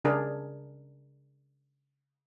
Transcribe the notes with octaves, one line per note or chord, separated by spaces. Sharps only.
C#3 D4 G#4 A#4